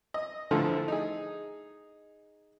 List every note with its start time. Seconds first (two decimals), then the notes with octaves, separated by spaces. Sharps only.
0.14 D#5
0.51 A1 D3 F3 A3 F4 A4
0.88 D#4 G#4